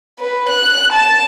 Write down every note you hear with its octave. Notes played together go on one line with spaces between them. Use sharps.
B4
F#6
A5